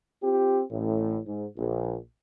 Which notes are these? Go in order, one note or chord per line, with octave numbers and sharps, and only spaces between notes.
C4 F4 G4
A1 A2
G#2
A#1